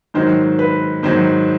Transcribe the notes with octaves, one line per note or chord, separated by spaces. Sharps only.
G#2 D#3 F#3 C5
B4
G#2 D#3 F#3 C5